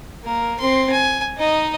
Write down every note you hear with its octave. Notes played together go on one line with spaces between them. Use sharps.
A#3 A#4
C4 C6
G#5
D#4 D#5